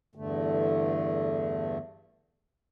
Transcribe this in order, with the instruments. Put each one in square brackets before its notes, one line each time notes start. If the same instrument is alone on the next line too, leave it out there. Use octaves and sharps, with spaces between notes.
[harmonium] E2 G2 D3 A3